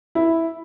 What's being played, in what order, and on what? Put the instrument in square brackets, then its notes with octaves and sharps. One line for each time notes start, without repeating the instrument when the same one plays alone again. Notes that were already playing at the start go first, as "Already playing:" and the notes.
[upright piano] E4